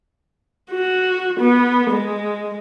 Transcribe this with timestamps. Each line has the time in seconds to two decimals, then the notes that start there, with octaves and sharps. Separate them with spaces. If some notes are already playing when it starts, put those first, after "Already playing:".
0.71 F#4
1.40 B3
1.90 G#3